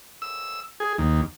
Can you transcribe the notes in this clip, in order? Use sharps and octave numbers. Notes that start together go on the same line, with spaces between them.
E6
G#4
D#2